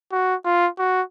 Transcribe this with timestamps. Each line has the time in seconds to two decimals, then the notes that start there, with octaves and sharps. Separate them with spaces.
0.12 F#4
0.45 F4
0.78 F#4